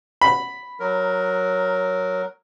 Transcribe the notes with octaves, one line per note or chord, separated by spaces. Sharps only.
B5
F#3 A#4